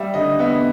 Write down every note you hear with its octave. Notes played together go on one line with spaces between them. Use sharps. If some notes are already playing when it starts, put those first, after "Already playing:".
Already playing: G3 E5
D3 D#5
B3 E5